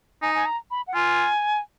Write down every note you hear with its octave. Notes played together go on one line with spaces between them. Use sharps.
D#4 G#5
G#5
A#5
B5
F#5
F4 G#5